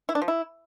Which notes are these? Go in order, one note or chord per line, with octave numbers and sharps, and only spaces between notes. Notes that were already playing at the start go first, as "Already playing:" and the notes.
E4
D4
F3
E4